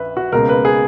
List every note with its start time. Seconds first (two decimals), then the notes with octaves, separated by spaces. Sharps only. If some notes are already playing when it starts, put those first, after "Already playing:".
Already playing: A#1 B4 E5
0.17 F#4
0.32 C#2 B2 A#3 A#4
0.49 B4
0.65 G#4